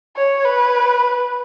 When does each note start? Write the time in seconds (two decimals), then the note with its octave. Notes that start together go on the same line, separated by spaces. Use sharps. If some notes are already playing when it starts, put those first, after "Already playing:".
0.16 C#5
0.45 B4